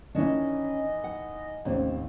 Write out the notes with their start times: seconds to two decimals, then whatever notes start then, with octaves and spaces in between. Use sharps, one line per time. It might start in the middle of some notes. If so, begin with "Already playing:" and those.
0.15 D#3 E3 C#4 D4 D#5
1.04 F#5
1.65 A1 D#2 C3 C5